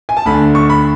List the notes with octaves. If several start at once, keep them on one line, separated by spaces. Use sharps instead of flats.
G#5
A5
D2 D3 B5
C#6
B5